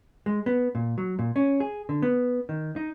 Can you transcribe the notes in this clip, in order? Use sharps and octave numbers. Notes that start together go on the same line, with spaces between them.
G#3
B3
A#2
F#3
A#2
C#4
G#4
D3
B3
D#3
D#4